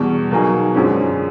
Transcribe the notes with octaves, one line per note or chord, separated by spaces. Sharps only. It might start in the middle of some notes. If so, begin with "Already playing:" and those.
Already playing: E2 B2 G3
B2 F#3 A#3 D#4 G#4
F#2 D3 F3 G#3 C#4